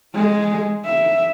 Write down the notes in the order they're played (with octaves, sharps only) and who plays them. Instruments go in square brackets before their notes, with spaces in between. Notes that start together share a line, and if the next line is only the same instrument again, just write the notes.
[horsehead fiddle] G#3
E5